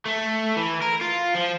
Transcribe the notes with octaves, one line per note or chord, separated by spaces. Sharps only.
A3
E3
A#4
F4
F3